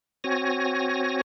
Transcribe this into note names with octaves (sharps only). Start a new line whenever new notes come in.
C4 F#4 C#5 G#5 A#6